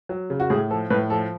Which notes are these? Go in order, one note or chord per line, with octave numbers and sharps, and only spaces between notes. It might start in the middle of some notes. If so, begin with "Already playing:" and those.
F#3
C#3
F#4
A2 G#4
F3 A4
A2 B4
F3 A4